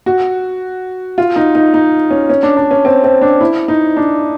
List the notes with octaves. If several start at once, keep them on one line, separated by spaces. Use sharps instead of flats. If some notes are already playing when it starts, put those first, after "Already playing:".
F#4
F4
D#4
D#4
D#4
C#4
C#4
D4
D4
C#4
C4
C4
D4
E4
D#4
D4